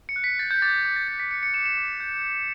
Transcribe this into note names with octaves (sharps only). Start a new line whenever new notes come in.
C#7
F#6
B6
G6 A6
G6
D6 A6
A6
D6 G6
A6
G6 A6
B6
G6 C#7
C#7
D6 E7
E7
D6
G6
F#6